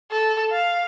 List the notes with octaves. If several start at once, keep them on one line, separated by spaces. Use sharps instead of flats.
A4
F5